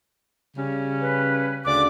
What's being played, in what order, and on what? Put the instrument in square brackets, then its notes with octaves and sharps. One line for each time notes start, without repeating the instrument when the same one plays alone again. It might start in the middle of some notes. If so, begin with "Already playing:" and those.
[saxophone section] C#3 G3 C#4
[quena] B4
[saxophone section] D2 C#3 D5 [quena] D6